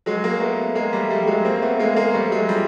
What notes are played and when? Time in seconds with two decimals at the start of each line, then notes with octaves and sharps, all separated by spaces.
0.06 F#3 G#3
0.23 G#3 A#3
0.41 A3 B3
0.75 G#3 A#3
0.93 G3 A3
1.10 G3 A3
1.23 G3
1.27 F#3 G#3
1.45 A#3 C4
1.62 A3 B3
1.79 G#3 A#3
1.96 G#3 A#3
2.14 G3 A3
2.32 F#3 G#3
2.49 F3 G3